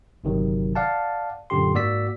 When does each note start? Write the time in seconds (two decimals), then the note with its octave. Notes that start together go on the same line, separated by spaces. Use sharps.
0.24 G1 C3 D#3 F#3
0.75 D5 F5 F#5 A5
1.50 F#2 A#2 D3 G4 C6
1.74 G#2 A#3 F#4 D5 E6 B6